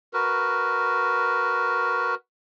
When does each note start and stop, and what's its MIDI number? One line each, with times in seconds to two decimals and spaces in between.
0.14 2.15 66
0.14 2.15 70
0.14 2.15 71